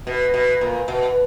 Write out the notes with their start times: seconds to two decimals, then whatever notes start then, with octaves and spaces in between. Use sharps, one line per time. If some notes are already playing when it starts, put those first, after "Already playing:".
0.07 B2
0.34 B2
0.61 A#2
0.88 B2